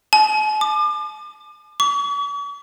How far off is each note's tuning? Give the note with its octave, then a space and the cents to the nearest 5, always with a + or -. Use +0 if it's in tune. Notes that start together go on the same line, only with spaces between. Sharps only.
A5 -45
D6 +40
C#6 +45